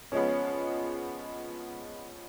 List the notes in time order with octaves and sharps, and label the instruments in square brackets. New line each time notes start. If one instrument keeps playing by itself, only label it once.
[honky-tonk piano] F3 G#3 B3 [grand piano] C#4